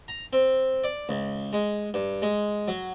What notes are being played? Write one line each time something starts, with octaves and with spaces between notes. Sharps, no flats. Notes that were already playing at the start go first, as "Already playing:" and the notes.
A#5
C4
D5
C#2
G#3
G2
G#3
F#3